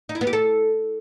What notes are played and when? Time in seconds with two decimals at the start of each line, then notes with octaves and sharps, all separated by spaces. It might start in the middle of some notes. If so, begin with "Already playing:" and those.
0.09 D#4
0.15 E4
0.21 B3
0.27 G4
0.33 A4